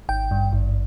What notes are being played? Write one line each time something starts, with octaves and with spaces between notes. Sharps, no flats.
G#1 G5
G2
G#1